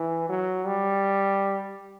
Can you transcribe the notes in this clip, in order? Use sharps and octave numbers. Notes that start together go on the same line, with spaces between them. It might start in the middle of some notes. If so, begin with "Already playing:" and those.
Already playing: E3
F#3
G3